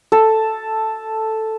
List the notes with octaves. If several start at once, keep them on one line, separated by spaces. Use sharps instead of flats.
A4